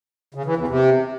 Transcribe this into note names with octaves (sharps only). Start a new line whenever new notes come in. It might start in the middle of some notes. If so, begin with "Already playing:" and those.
C#3
E3
E2
C3